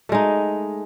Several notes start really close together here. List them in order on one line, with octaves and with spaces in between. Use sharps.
A3 G#3 D#4